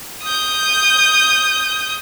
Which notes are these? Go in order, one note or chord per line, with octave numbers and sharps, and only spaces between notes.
D#6 G6